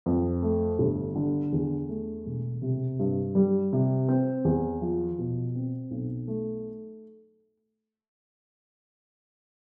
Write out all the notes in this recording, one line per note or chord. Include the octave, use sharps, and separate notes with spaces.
F2
A3
G1
D3
E2
A3
E1
C3
G2
G3
C3
C4
E2
F3
B2
C4
B1
A3